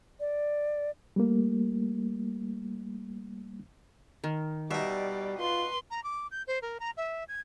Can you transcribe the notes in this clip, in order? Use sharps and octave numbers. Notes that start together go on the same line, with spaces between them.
D5
G3 A3 A#3
D#3
B2 G3 D#4 D5 E5
F4 B4 C6
A#5
D6
G6
C5
A#4
A#5
E5
G#6